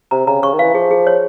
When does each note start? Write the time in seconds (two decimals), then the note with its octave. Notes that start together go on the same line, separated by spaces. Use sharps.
0.11 C3 A#5
0.27 C#3 A#5
0.42 C#3 C#6
0.53 D#3
0.59 E3 F5
0.74 F3 G#4
0.91 G#4
1.07 C#5